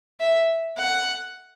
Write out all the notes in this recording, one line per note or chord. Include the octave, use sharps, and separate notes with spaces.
E5
F#5